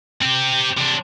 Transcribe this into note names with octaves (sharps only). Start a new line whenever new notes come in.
C4 G4
C3 D4